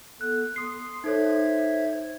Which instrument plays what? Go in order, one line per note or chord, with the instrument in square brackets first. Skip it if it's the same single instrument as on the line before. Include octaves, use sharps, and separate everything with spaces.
[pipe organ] B3 A4 [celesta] F#6
[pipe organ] C6 [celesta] D#6 C7
[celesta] D#4 A4 C#5 [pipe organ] C5 E5 G#6